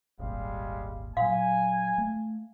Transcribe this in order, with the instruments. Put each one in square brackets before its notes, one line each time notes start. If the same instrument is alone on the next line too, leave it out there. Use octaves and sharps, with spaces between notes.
[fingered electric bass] D#1 G#1 A#2 [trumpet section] G3 G#3 F5
[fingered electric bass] A#2 F#3 [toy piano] F5 [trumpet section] G#5
[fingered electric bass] A3